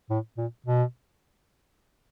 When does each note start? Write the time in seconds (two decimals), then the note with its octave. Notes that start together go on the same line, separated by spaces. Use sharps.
0.10 A2
0.38 A#2
0.66 B2